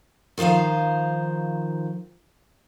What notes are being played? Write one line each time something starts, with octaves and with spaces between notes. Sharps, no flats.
D#3 F3 D#4 C5 F5